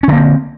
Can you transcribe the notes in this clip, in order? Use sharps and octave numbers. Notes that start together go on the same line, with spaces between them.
D3 A#3 C4 C#4